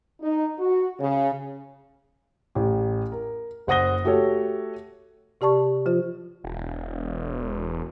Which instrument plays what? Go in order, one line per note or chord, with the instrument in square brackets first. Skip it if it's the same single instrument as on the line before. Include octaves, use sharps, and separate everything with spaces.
[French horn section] D#4
F#4
C#3
[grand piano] A1 G4
A#4
F#1 C5 F#5 D#6 A#6 G7
A3 F#4 G4 A4 C#5
[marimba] C3 G4 D5 A5 C#6
F3 F4 C5
[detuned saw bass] E1